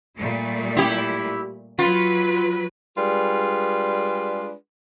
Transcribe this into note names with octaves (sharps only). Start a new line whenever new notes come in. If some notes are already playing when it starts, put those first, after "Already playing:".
A#2 G3 A3
E4 G4
F#3 F4 B4
G3 G#3 D4 F4 G#4 B4